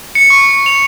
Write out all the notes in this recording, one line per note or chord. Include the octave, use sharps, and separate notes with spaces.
C#7
C#6
F7